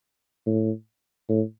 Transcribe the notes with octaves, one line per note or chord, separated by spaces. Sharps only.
A2
A2